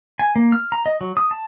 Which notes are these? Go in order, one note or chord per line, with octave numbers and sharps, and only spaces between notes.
G#5
A#3
F6
A#5
D#5
F#3
D#6
A5